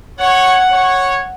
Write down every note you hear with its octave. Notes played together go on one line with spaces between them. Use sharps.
C#5 F#5
C#5